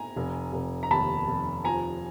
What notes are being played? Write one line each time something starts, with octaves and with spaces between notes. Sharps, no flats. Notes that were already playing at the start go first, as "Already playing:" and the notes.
Already playing: G#5 A#5
F1
F1
A#5
D#2 A5 B5
F1
F3 G#5 A#5